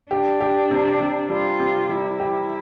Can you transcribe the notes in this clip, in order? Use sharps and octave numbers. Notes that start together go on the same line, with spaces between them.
D4 G4
G4
C3
C3
G3 F4
C3
G3 E4
G4